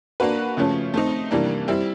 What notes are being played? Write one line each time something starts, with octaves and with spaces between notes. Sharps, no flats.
A#3 D4 F#4 B4
C#3 F3 A3 C#4
A3 C4 D#4
C3 E3 G3 A#3 D4
G3 C4 E4